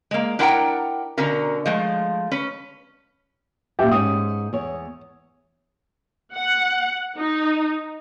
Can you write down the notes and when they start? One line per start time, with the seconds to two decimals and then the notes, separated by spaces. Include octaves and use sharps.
0.11 G#3 A#3
0.39 D4 E4 A#4 F#5 G5 A#5
1.17 B2 D3 C#4 A#4
1.66 F3 G#3 A3
2.31 C#4 B4
3.79 F#2 A#2 G4 E5 G5
3.91 G#2 C#4 D#6
4.53 E2 C#5
6.34 F#5
7.17 D#4